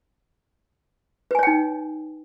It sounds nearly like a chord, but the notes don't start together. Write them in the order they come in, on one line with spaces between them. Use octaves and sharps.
B4 G#5 C#5 G5 D#4